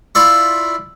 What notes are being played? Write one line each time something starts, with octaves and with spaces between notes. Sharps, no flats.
E4 F4 D5 E5 C#6